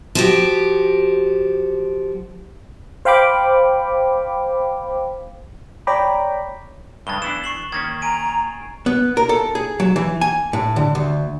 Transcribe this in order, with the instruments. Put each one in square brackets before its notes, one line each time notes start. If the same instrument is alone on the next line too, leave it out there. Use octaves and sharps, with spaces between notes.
[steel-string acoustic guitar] F3 F#4 G4
[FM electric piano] C5 F5 G5 B5 D6
C#5 D5 G5 A#5 B5 D6
[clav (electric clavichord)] G2 C#3 G#3 [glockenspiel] A6 G7
[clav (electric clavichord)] E3 B3 D4 [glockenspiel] E7
[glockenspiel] C#6 C7 F#7
[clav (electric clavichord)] D#3 A#3 C#4 [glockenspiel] G#6 A6
[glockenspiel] G#5 D7 D#7 [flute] A#5
[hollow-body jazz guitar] B3
A#4
A4
G#4
F#3
E3
G#5
A2
D3
D2